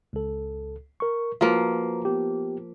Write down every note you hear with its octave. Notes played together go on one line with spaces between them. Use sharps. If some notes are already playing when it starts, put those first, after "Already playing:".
C#2 A4
A#4 C#6
F3 A#3 F#4 B4 A#5
B3 G4